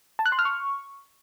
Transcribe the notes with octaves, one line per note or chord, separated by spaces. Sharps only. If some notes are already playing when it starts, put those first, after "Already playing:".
A5
F#6
C6
F6
C#6